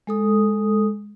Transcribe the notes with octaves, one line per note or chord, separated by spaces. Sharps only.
G#3 A4 D#6